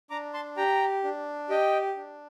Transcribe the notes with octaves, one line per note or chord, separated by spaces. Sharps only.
D4 A#5 D6
A5 C6
G4 G5 A#5
D4
G4 D#5 G5
D4